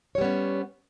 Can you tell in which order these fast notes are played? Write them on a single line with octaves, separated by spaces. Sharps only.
C#5 G3 B3 C#4